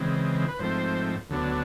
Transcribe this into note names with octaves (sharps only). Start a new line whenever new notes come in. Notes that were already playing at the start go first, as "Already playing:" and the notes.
Already playing: C#3 E3 G#3 C4
B4
G#2 F3 A3 C4 C5
D2 D3 F#3 B3 D4